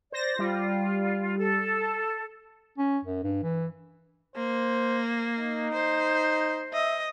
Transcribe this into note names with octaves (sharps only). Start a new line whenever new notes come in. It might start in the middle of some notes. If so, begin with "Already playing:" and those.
C5 D5 A#6
G3 F4
A4
C#4
F#2
G2
E3
A#3 C5
D#4
C5
D#5 E5